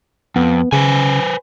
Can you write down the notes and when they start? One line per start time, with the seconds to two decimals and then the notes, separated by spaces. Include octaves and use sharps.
0.36 F2 B3
0.72 C#3 B4 C5 G#5